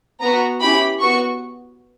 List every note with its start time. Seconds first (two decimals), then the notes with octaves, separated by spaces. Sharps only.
0.20 B3 F#4 A#5
0.60 C#4 E4 G4 B5
1.00 B3 F#4 C#6